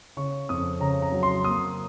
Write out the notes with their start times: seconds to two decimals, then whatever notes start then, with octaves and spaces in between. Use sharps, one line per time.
0.17 C#3 C#6
0.49 F2 D#6
0.80 C#3 A#5
1.02 A#5
1.12 F#3
1.23 C6
1.44 A#3 D#6